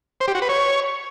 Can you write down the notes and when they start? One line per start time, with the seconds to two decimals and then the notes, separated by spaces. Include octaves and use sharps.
0.20 C5
0.28 G4
0.35 F#4
0.42 B4
0.49 C#5